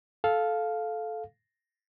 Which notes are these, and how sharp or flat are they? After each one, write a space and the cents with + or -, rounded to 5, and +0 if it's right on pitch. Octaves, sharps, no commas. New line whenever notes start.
A4 -15 F5 +0